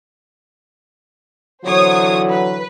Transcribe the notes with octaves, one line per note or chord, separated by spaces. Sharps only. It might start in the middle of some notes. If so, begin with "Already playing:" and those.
D3 E3 F#3 C5 C#5 D#6
B4